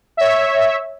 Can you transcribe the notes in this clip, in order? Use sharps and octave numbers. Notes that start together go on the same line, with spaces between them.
C#5 E5